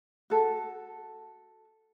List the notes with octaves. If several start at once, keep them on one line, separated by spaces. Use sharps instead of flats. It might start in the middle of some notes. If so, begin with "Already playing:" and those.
F#4 A4